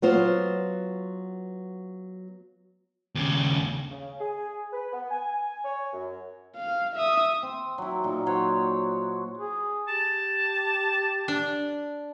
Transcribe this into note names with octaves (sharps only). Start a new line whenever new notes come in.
F#3 B3 F4 C5
D#2 C#3
C#3
G#4
B4
B3
G#5
C#5
F#2
F5
E5 D#6
C4
F#3 E4
A#2 D#4
F#3 F#4 C5 C#5
G#4
G4 A5
D4